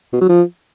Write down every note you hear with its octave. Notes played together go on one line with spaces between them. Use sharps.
B2
F#3
F3